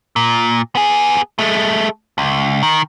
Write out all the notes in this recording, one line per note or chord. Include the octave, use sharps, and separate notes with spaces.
A#2
B3 G#4
G#3 A3
C#2
D#3